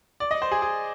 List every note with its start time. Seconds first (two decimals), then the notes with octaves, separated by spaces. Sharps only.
0.20 D5
0.31 D#5
0.42 C5
0.52 G#4
0.62 G#4